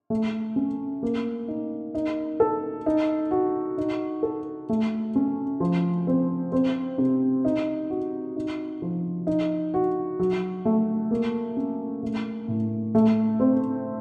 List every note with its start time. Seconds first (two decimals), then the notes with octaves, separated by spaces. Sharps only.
0.10 A3
0.56 C#4
1.03 A#3
1.48 D#4
1.95 D#4
2.40 A4
2.86 D#4
3.31 F#4
3.78 D#4
4.23 A4
4.69 A3
5.15 C#4
5.60 F3
6.07 C4
6.52 C4
6.98 C3
7.45 D#4
7.90 F#4
8.36 D#4
8.82 F3
9.27 D#4
9.74 F#4
10.19 F#3
10.65 A3
11.11 A#3
11.57 C#4
12.03 A3
12.48 A2
12.95 A3
13.40 C4